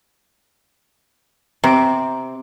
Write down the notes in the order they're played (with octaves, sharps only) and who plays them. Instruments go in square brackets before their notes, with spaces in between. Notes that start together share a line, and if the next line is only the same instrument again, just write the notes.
[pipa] C3 [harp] C4 D6 [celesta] A#5